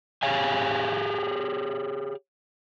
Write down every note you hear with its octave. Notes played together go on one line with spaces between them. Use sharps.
G4 G#4 C#5 F5 G#5